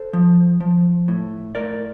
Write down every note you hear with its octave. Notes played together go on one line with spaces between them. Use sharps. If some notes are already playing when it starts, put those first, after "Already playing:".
Already playing: A4 C5
F3
F3
A2
A2 A#4 D5